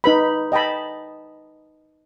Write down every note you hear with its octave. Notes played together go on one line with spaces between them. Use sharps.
D#4 B4 B5
D#5 G5 A5 B5